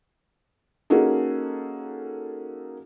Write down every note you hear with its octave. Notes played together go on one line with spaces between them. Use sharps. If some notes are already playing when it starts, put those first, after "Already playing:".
A#3 C#4 D#4 F#4 G#4 A4